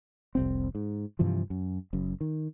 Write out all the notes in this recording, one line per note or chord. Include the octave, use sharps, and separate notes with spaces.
F1 C2 C4
G#2
G2 C3 E3 F3
F#2
F#1 F#2
D#3